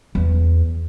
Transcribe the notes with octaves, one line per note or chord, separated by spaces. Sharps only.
E2